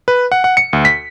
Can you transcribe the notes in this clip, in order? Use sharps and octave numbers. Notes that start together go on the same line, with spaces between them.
B4
F#5
F#5
C#7
D2
B6